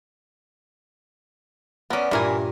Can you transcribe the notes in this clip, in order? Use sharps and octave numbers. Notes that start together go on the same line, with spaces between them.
B3 C#4 A#4 D5
G2 A#2 E3 A#4 G#5